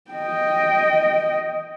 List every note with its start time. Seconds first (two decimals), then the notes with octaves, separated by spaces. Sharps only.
0.11 D#5 G5